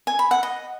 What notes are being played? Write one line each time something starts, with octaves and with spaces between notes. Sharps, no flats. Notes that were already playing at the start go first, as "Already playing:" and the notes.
G#5
B5
F#5
D#5